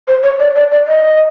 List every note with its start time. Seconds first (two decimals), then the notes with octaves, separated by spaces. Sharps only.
0.08 C5
0.23 C#5
0.39 D5
0.55 D5
0.72 D5
0.88 D#5